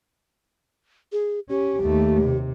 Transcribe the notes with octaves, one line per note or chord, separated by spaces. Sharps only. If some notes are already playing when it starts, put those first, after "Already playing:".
G#4
C#4 G4
D#2 A3
C3